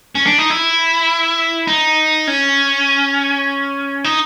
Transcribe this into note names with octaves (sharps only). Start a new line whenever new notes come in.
C#4
D4
D#4
E4
D#4
C#4
D#4